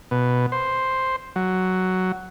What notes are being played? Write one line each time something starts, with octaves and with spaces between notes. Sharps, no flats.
B2
C5
F#3